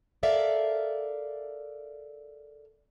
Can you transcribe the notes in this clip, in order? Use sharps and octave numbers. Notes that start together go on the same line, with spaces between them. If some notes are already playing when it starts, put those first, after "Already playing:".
A4 A#4 D5 E5 F5